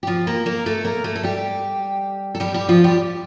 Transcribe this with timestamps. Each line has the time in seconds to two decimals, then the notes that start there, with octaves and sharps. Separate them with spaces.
0.03 G4
0.07 F3 F4
0.27 A#3 A#4
0.46 A#3 A#4
0.66 A3 A4
0.85 A#3 A#4
1.04 A3 A4
1.15 A4
1.23 G3 G4
2.35 A4
2.40 G3 G4
2.54 G3 G4
2.69 F3 F4
2.84 G3 G4